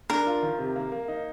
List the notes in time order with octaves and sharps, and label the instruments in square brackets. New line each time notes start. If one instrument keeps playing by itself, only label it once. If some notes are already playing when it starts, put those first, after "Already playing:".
[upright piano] D4 [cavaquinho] A#4
[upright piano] F4
D#3
C3
A#3
A#3
D#4